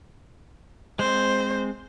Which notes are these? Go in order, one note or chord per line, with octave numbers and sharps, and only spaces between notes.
G#3 C4 C5